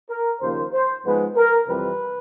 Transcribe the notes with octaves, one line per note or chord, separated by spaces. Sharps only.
A#4
D#2 C#3 F3 A#3 C5
C5
G#2 F3 G#3 B3 B4
A#4
F2 C3 E3 G3 C4 B4